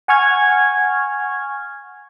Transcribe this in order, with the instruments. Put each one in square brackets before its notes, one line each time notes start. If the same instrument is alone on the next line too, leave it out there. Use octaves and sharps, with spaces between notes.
[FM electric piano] F#5 G#5 C#6 F6 G#6